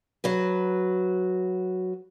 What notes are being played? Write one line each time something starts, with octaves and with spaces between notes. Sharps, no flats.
F#3 F#4 B4